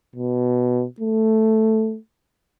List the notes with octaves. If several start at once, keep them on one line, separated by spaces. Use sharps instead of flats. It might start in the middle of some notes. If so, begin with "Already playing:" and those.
B2
A3